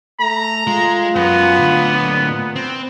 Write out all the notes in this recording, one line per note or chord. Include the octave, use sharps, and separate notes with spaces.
A3 A#5
G#3 F4
F#2 B3
A2 D3
A#2
C4